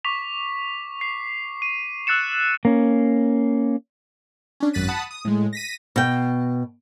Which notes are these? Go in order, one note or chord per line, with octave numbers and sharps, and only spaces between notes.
C#6 D6 B6 F7
C7
D#7
E6 F#6 A6 C#7 E7
A#3 C#4
C#4 D4
G#1 F#2 F#6 A6 B6 D#7
F#5 A5 B5 D#6
D#6
A2 G#3
A#6 B6 D#7
B2 G5